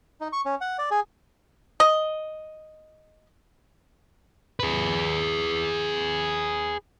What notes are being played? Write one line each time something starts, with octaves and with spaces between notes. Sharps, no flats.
D#4
C#6
C#4
F#5
D5
G#4
D#5
G#4 B4